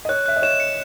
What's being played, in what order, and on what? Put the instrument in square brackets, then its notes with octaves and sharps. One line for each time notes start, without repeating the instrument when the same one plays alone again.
[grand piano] D#5
[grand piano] C#5 [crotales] F#6
[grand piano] E5 [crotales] F#6
[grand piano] D#5
[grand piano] C#5 [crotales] E7
[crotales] C#7